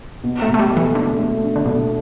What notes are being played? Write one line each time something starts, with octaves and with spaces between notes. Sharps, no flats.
B2
A3
B2
A3
G3
A3
E3
D3 A3
A3
D4
D3
B2 A3